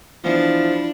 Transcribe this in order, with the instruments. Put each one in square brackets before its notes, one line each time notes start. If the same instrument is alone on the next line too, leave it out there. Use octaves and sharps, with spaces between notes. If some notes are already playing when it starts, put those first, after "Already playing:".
[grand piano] E3 B3 [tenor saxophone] F3 [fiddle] D4 [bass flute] E4